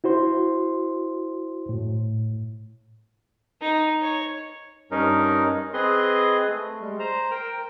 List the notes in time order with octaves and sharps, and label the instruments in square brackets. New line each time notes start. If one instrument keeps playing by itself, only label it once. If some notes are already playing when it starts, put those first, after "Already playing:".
[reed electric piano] E4 F#4 C5 C6
A2
[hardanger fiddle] D#4
C#5
[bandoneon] G2 C#4 D#4 A#4
C4 G#4 B4 D#5 C6
A3
G3 G#3
C5 A#5
A#4 G5